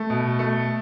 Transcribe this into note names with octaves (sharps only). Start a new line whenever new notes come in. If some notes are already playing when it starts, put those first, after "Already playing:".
Already playing: A3
B2
A3